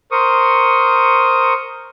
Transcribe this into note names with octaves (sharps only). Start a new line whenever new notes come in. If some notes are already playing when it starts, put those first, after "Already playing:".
A#4 C5 C#6 D#6